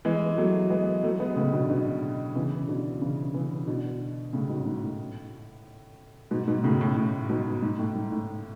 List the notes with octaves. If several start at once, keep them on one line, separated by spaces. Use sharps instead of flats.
E3 G#3
F#3 A3
G#3 B3
F#3 A3
G#3 B3
A2 C#3
B2 D3
B2 D3
C#3 E3
B2 D3
C#3 E3
C#3 E3
B2 D3
A2 C#3
G#2 B2
G#2
A2
G#2 B2
G#2 B2
A2 C#3
A2
A2
G#2 B2
G#2
A2
G#2
A2